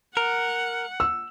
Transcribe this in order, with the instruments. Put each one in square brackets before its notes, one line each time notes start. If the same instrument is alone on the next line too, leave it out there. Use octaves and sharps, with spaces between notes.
[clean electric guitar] A#4 [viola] F#5
[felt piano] E6